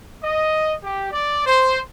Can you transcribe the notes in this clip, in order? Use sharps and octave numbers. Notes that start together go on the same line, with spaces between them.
D#5
G4
D5
C5